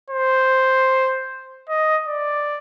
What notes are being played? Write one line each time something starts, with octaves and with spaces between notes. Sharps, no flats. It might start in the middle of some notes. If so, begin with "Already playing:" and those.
C5
D#5
D5